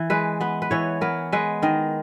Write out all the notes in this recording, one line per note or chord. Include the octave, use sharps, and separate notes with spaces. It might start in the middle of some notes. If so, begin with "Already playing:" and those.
Already playing: E3
G#3 B4
B3 B4
B4
E3 C#5
B3 A#4
G#3 B4
D#3 D#5